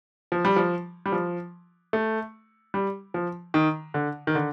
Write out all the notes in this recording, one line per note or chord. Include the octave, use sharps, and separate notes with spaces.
F3
G3
F3
G3
F3
A3
G3
F3
D#3
D3
D#3
D3